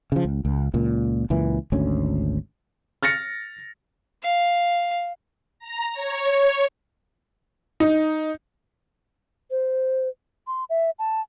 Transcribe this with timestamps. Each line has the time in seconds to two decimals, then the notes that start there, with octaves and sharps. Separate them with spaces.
0.12 C#3 F3
0.25 C#2
0.45 C#2
0.74 C#2 A#2
1.30 C#2 A#2 E3
1.72 G#1 D2 C#4
3.03 F6 A6 A#6 C#7
4.23 F5
5.59 A#5
5.93 C#5
7.80 D#4
9.51 C5
10.47 C6
10.70 E5
10.99 A5